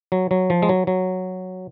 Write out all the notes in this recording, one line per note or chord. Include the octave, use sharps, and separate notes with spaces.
F#3
F#3
F3
G#3
F#3
F#3